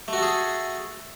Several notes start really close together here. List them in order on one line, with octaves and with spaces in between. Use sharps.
A3 F#4 A4 G#4